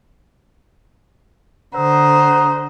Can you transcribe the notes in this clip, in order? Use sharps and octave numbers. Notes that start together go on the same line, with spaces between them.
D3 C5 F#5 A#5 D#6